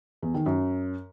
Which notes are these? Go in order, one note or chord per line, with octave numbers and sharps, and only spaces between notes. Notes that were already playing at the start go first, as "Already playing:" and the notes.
E2
D#3
F#2